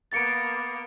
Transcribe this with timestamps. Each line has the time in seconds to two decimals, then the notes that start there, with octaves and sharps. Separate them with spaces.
0.12 A#3 B3 A6 C#7 D7